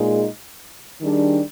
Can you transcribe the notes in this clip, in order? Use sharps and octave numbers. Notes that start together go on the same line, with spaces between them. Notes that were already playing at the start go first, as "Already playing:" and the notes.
Already playing: A#2 G#3 D#4 G#4
D#3 G3 D4 G#4